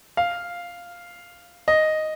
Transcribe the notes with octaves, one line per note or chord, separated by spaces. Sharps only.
F5
D#5